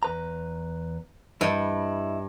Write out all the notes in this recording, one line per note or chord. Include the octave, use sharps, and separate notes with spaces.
E2 B4 A#5
G2 E4 D#5